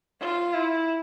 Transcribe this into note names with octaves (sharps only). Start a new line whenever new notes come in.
F4
E4